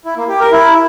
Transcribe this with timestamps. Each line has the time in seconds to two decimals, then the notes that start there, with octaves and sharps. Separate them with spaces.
0.05 E4
0.17 A#3
0.28 G4
0.40 A#4
0.52 E4